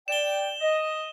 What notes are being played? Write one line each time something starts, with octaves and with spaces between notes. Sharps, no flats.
D5 G5 E7 G7
D#5